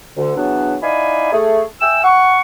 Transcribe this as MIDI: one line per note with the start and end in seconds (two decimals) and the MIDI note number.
0.17 0.35 38
0.17 0.35 50
0.37 0.77 49
0.37 0.77 52
0.37 0.77 54
0.37 0.77 59
0.37 0.77 62
0.82 1.30 63
0.82 1.30 64
0.82 1.30 74
0.82 1.30 77
0.82 1.30 80
0.82 1.30 83
1.32 1.62 57
1.32 1.62 68
1.81 2.03 76
1.81 2.03 79
1.81 2.03 80
1.81 2.03 88
2.04 2.40 78
2.04 2.40 85